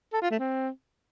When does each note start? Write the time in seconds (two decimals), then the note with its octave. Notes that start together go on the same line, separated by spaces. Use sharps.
0.13 A4
0.22 F4
0.30 A3
0.39 C4